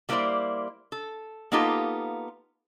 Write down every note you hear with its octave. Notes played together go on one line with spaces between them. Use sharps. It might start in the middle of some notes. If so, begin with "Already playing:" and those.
G3 A#3 E4 A4 C5 D5
A4
A#3 B3 D#4 F4 G4 A4